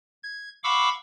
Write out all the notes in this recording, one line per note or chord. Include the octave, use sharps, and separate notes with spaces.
G#6
F5 F#5 B5 C#6 D6 E6